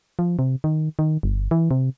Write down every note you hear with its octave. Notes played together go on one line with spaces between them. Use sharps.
F3
C3
D#3
D#3
G1
E3
C3